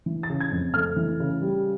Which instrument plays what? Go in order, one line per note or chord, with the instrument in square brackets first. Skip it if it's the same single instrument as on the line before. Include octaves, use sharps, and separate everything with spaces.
[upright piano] E3
A6
C#3
G#6
F2
A3 F6
E3
C#3
G3